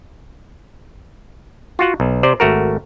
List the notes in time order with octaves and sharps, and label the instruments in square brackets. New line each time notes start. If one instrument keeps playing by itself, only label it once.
[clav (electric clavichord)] F4 F#4 F#5
B1
C3 C5 D5
G#1 A3 F#4 A#4